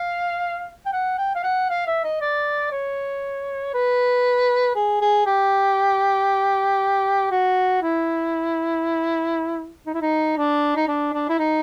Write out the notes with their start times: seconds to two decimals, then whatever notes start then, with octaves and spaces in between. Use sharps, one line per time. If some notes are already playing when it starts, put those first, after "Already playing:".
Already playing: F5
0.86 G5
0.92 F#5
1.18 G5
1.35 F5
1.43 F#5
1.70 F5
1.87 E5
2.04 D#5
2.21 D5
2.71 C#5
3.74 B4
4.75 G#4
5.01 G#4
5.26 G4
7.31 F#4
7.82 E4
9.86 D#4
9.94 E4
10.01 D#4
10.37 D4
10.76 D#4
10.88 D4
11.13 D4
11.29 E4
11.38 D#4